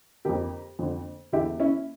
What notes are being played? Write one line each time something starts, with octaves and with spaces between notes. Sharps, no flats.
F2 D3 G4 A#4
F2 D3
E2 D3 E4 G4
C#4 E4